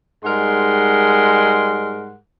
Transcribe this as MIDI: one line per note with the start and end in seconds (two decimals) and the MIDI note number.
0.25 2.17 44
0.25 2.17 55
0.25 2.17 56
0.25 2.17 70
0.25 2.17 78
0.25 2.17 84